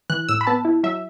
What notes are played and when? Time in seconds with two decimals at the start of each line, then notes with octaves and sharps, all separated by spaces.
0.10 E3 F#6
0.29 A2 E6
0.41 B5
0.47 B3 A5
0.65 E4
0.83 F#3 E5